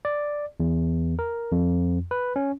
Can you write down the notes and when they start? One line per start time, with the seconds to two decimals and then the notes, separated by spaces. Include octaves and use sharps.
0.05 D5
0.60 E2
1.19 A#4
1.52 F2
2.11 B4
2.36 C#4